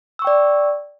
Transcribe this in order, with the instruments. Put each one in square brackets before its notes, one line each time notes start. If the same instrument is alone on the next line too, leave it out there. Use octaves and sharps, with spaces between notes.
[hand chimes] E6
C#6
G5
D5